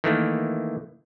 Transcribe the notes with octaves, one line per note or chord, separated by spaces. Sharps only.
D#3 E3 A3 A#3